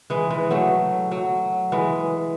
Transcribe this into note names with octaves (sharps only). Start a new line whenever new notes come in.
E3 G#3
E3 G#3
F#3 A3
F#3
E3 G#3